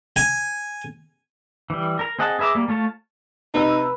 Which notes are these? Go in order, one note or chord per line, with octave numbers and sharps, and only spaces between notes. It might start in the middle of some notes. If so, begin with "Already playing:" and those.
G#5
E3 G3
A#4 A#5
C4 G#4 D#5 F#5 A5
G#4 B4 E5 A#5 D6
G3 A#3
A3 F4 C#5 A5
C3 D#4 B4 E6